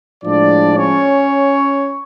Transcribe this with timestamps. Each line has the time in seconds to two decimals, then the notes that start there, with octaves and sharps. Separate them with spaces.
0.23 A2 F3 G#3 D4 D5
0.77 C#4 C#5